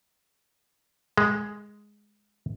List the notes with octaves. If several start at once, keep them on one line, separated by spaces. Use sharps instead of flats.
G#3